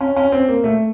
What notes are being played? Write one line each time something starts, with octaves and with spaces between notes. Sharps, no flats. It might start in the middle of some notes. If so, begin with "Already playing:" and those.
C#4
C#4
C4
A#3
A3